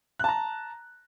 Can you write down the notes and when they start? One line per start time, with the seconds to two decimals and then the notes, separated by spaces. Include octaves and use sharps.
0.19 F#6
0.24 A5
0.29 A#5